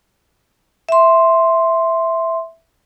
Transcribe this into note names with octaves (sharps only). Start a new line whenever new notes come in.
E5 C6